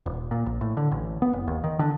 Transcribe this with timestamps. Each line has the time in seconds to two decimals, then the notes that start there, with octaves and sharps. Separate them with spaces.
0.06 D#1
0.31 A#2
0.46 A#1
0.61 A2
0.77 D3
0.91 A1
1.22 B3
1.33 F#1
1.47 D#2
1.64 D#3
1.79 D3